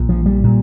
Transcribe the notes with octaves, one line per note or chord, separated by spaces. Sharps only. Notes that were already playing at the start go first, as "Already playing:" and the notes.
Already playing: A#1 A#2
F3
G3
A#2